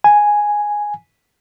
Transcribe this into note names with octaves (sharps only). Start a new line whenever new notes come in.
G#5